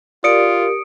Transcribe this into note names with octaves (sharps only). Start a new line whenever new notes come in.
F4 G4 A#4 D5 D#6 C#7 D7